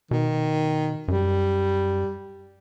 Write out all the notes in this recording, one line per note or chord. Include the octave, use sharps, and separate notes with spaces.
B2 D#3
F#2 G3